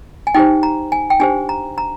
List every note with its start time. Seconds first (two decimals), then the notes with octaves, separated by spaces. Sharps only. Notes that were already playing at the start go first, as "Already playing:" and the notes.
0.27 G#5
0.34 D#4 G4 C5 G5
0.63 A#5
0.92 G#5
1.10 G5
1.20 D4 G4 C5 G#5
1.49 A#5
1.78 A#5